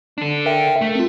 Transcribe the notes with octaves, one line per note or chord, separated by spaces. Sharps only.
D4 A4
A#4 E5 G5
A3
C4 F4